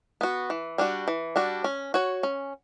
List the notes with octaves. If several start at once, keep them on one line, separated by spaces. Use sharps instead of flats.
B3 F#4
E3
G3 D4 F#4
E3
G3 D4 F#4
C#4
F#4 C#5
C#4